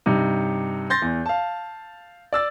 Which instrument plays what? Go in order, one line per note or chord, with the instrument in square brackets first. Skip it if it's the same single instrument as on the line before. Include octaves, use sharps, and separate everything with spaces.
[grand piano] G2 C3 D#4
C6 G6 A6 A#6
E2
F5 A5
D5 E6 A6